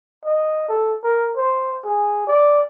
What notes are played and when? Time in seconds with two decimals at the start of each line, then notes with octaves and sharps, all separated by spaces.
0.25 D#5
0.69 A4
1.04 A#4
1.37 C5
1.85 G#4
2.27 D5